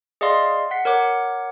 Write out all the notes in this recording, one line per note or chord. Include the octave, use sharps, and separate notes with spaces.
G#4 D5 D#5 F5 C6
F#5 B6 C7
A#4 C#5 F#5 D6